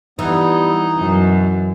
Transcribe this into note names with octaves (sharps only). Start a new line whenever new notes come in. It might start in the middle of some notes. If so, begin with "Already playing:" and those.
E3 G3 B3 D#4
F#2 B2